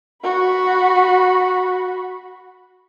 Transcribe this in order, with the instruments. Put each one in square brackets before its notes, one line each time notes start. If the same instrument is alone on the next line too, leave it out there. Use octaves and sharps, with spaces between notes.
[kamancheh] F#4 B5